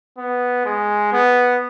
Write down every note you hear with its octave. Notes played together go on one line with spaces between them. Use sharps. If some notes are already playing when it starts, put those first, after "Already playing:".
B3
G#3
B3